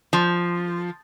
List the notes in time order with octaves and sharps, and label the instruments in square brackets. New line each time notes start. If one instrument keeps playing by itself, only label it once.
[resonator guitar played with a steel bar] F3